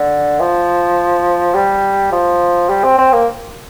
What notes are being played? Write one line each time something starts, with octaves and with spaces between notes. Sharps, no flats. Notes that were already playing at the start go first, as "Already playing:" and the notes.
Already playing: D3
F3
G3
F3
G3
C4
C4
A#3